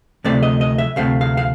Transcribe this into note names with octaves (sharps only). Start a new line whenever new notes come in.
D2 C3 F3 A3 D5
D#5
D#5
E5
D2 C3 F3 A3 F5
F5
F5